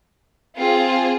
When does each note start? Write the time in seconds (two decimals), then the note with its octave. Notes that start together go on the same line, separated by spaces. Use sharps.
0.56 C4 F4 G#4